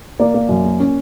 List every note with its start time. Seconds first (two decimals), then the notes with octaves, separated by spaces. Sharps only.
0.19 A#3 D5
0.34 A#3
0.49 F#2
0.65 A#3
0.80 C#4